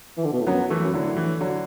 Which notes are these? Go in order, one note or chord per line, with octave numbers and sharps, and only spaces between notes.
E3
D3
B2
A2
F#2 F#3 B3
E3 A3
F#2
A2 D3 F#3
E3
D3 F#3